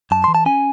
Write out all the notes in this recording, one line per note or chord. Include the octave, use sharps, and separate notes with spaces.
F#2 A5
E3 C6
A5
C#4 G#5